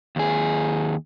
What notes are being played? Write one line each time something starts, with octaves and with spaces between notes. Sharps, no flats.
D#2 G#4